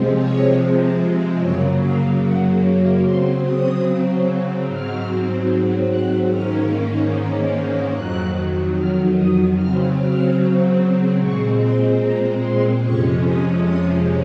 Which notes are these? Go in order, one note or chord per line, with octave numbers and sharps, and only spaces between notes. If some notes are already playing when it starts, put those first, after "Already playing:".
Already playing: C3 F3 G#3 C4
C#5
F#2 C#3 F#3 A#3 C#5
F5
F#5
C#3 F#3 C4 C6
D#6
G#2 F#3 C4 F6
F#6
G#2 D#3 A#3 C#4 F6
F2 D#3 F#3 F#6
F6
D#6
C#3 F#3 C4 F6
F6
A#2 G#3 C4 C#6
C6
A#5
C6
F2 C3 F3 G#3 C#4 C#6
D#6
D#6